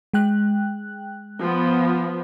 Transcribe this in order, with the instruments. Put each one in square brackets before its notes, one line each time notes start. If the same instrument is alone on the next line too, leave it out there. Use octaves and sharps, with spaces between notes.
[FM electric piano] G#3 G5 F#6
[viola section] F3 B3